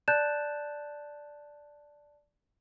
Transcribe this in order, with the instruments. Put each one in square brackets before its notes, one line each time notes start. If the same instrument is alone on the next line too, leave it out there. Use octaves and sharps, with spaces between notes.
[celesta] D5 A5 F#6 G6 A6 E7